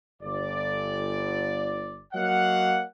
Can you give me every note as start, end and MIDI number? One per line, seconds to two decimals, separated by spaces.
0.22 2.01 31
0.22 2.01 74
2.13 2.82 54
2.13 2.82 58
2.13 2.82 73
2.13 2.82 75
2.13 2.82 77
2.13 2.82 78